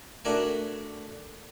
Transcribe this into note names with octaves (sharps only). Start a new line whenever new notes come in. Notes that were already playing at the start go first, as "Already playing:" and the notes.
A3 D4 F#4 A#4 G#5